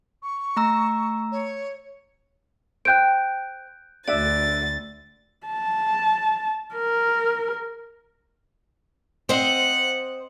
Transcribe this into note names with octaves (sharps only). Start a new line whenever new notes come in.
C#6
A3 A#5 E6
C#5
C5 G5 F#6 G6 D7
D2 D4 F#4 D5 E5 E6 A6
A5
A#4
C4 C5 D#5 F#5